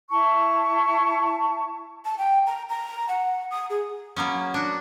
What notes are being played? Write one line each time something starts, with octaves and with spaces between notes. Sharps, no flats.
E4 A5 C#6
A5
G5
A#5
A#5
F#5
D#6
G#4
F#3 A#3 B3 C#4
D4 F#4